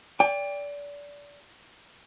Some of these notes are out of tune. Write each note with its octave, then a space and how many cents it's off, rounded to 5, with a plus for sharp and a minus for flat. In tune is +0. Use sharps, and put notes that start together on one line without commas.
D5 -25 G5 +30